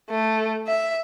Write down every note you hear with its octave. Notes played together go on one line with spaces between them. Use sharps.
A3
E5